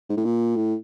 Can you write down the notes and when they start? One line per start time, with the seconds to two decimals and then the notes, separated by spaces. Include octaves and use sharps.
0.10 G#2
0.17 A2
0.25 A#2
0.56 A2